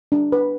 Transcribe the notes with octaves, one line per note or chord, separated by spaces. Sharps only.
D4
B4